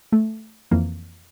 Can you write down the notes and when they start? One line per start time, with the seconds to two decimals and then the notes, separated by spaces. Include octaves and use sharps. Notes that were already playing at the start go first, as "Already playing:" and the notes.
0.12 A3
0.71 F2 E3 A#3